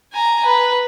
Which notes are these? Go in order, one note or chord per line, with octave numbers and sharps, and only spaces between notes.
G#5 A#5
B4